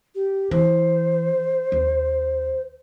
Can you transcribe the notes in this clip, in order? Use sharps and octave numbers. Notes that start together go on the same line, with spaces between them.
G4
E3 C5
D#2